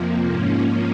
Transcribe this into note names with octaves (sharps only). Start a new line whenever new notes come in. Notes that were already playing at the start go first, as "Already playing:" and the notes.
Already playing: F2 C3 F3 A#3
G#2 F3 A#3 C#4